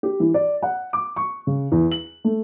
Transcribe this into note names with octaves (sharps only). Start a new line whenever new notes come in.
G4
E3
D5
F#5
D6
C#6
C#3
E2
F#7
A3